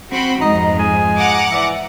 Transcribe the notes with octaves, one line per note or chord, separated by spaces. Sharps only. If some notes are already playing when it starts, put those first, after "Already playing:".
C4 F#4 B5
F2 G#2 D#4 D#5 A#5
F3 G#3 G#5
F#5 A#5 D6
E3 D5 E5